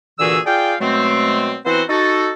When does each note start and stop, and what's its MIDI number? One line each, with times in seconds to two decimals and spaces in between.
0.19 0.39 46
0.19 0.39 50
0.19 0.39 52
0.19 0.39 66
0.19 0.39 68
0.19 0.39 88
0.46 0.74 65
0.46 0.74 68
0.46 0.74 74
0.46 0.74 77
0.46 0.74 79
0.80 1.56 47
0.80 1.56 54
0.80 1.56 56
0.80 1.56 57
0.80 1.56 60
1.66 1.83 52
1.66 1.83 59
1.66 1.83 60
1.66 1.83 64
1.66 1.83 66
1.66 1.83 72
1.90 2.32 63
1.90 2.32 66
1.90 2.32 69